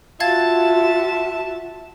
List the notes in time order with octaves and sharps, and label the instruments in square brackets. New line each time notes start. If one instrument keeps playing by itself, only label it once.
[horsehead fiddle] F4 F#4 [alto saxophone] E5 [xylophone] F5 G#6 A6 [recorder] A5